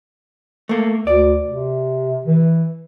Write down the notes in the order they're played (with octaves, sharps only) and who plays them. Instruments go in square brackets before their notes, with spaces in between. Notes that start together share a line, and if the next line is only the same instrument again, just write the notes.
[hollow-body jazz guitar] A3 A#3
[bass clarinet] D2 [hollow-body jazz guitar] D5
[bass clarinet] C3
E3